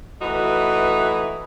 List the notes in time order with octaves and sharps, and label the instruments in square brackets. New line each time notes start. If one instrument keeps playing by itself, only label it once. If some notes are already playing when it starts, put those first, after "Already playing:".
[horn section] E3 A3 D#4 F#4 B4